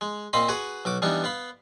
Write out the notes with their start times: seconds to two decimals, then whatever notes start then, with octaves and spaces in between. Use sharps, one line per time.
0.01 G#3
0.33 A#2 C4 C5 D#5 F5 B5
0.48 F#4 G#4 B4 F#5
0.85 B1 F#4 D6
1.02 E3 G3 B3 D4 D#4
1.24 B3 F5 B5